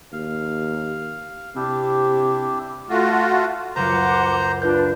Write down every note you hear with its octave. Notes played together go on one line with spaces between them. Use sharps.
D#2 F5
C3 D4 E4 G4
A3 F4 F#4
C#2 F#2 C5 F#5 A#5 D6
D4 F4 B4 G6